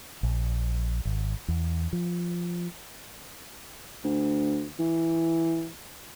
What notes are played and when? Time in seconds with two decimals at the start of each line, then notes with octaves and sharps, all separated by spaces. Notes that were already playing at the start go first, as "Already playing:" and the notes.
0.23 A#1
1.05 G#1
1.48 E2
1.93 F3
4.04 D2
4.79 E3